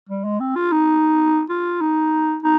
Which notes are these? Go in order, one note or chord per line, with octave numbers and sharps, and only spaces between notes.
G3
G#3
C4
F4
D#4
F4
D#4
D#4